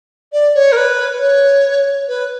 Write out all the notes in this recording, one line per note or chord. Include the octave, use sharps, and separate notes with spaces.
D5
C#5
A#4
B4
C#5
B4